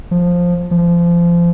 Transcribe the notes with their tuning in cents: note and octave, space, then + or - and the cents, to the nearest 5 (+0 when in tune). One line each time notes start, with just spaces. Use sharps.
F3 +10
F3 -25